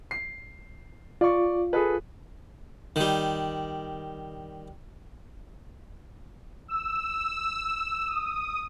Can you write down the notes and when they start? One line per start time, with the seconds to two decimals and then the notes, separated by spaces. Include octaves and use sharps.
0.11 C7
1.21 F4 D5 C#6
1.73 G#4 A4 B4
2.96 D#3 G3
6.68 E6
8.07 D#6